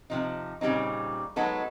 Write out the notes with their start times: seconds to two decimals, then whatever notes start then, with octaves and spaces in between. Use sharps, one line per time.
0.10 C3 F3 D#4
0.61 A#2 C#3 G3 C4 D#4
1.36 F#3 G#3 B3 D#4 A4